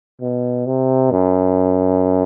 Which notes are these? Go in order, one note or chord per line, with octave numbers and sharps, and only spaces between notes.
B2
C3
F#2